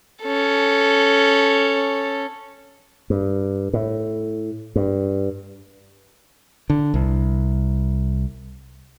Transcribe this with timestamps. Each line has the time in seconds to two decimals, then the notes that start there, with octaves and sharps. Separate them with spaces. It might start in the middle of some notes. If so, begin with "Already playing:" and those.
0.23 C#4 A4
3.10 G2
3.73 A2
4.76 G2
6.70 D3
6.94 C2